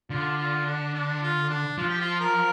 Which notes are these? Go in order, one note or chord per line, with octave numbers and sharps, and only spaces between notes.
D3 F4
F4
D4
D4
F4
D4
F3 F4
G4
F4
A#4